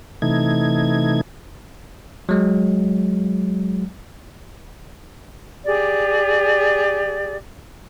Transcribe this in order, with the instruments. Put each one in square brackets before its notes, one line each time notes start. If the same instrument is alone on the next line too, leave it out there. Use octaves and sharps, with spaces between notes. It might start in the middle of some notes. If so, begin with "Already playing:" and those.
[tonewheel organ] C3 E3 A3 D#4 G#6
[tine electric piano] F#3 G#3
[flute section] G4 G#4 D5